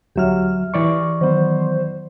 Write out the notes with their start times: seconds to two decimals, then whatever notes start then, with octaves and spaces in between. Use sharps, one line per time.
0.16 D2 F#3 G4 E5 F6
0.74 E3 D5 C#6
1.21 D#3 F#3 B3 C5